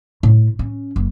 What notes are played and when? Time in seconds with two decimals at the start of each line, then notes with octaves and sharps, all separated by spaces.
0.23 A2
0.59 C#4
0.96 F#1